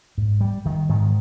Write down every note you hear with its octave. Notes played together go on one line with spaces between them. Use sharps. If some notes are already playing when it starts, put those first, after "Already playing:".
G#2
G3
D#3
G#2 D#3